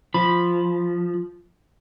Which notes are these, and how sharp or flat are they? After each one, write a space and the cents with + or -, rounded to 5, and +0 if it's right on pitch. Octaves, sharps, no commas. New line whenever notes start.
F3 +0 B5 +0